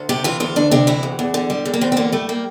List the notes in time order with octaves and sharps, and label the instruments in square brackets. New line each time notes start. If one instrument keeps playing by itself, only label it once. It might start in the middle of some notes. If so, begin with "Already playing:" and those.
Already playing: [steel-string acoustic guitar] D2
C3 G4
E3 F4
D2 F4
D2 D4
C3 D4
E3 E4
D2
E2
D3
G3
E2
A#3
E2 C4
C4
D3 A#3
G3 A3
A#3